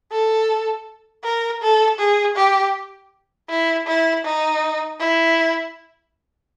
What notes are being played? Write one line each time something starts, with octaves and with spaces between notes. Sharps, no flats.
A4
A#4
A4
G#4
G4
E4
E4
D#4
E4